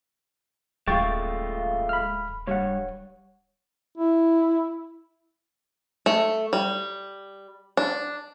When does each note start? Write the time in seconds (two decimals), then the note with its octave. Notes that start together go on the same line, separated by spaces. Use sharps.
0.88 D1 G#3 A3 F4 G5 C#6 A6
1.89 B5 F6
2.47 G2 G3 C#5 F#5
3.97 E4
6.06 A3
6.53 G3
7.77 D4